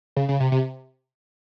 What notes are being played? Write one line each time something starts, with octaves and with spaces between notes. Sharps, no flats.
C#3
C#3
C3
C3